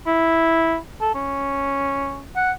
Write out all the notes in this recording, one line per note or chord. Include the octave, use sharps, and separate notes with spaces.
E4
A4
C#4
F#5